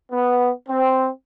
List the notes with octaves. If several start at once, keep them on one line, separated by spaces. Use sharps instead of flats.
B3
C4